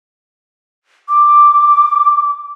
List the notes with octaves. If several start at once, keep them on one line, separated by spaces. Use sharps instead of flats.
D6